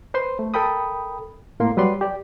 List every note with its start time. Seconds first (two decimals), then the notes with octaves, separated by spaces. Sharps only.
0.14 B4 C5 C6
0.39 A3
0.54 A4 A#4 G5 B5 D#6
1.60 A2 A#3 C6
1.77 F#3 G3 B4 D5 C6
2.01 G4 D5